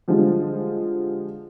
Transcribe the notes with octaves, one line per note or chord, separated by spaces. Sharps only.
D3 F3 G3 G#3